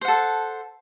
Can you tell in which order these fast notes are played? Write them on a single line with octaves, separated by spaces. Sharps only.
C5 F#5 A4